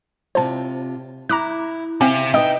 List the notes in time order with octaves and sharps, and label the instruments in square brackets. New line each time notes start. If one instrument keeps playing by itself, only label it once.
[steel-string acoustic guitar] C3 F4 [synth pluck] C5 A5
[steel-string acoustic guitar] E4 [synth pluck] A#5 D6 F#6
[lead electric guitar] C3 [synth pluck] C4 F5 G#5 [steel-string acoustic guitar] E5
[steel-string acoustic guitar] D#4 B4 E5 [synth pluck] D#5 D#6 [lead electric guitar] G5